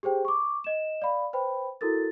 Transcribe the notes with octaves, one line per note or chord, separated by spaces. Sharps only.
G4 G#4 C5 G5
C#6 D6
D#5 E7
D5 F5 B5
B4 C5 G5 B5
E4 F#4 A4 A#4 A6